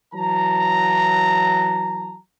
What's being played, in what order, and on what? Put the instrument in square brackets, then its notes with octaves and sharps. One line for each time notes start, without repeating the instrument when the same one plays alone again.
[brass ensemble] E3 F#3 A5 A#5